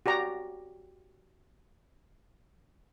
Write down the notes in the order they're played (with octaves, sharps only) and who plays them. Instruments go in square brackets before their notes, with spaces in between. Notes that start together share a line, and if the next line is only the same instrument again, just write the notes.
[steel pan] F#4 G4 D5 A#5